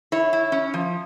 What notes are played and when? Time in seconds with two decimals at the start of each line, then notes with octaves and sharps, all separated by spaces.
0.12 E4 C#5
0.33 E4
0.52 C#4
0.74 F3